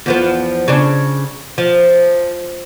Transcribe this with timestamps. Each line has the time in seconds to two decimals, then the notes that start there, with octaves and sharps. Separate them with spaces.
0.06 E2 F3 B3
0.68 C#3 D4
1.58 F3